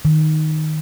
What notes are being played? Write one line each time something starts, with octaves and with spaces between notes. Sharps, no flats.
D#3